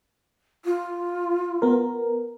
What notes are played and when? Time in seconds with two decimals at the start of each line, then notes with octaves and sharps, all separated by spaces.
0.65 F4
1.62 B3 A#4